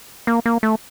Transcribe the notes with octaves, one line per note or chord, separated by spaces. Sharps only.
A#3
A#3
A3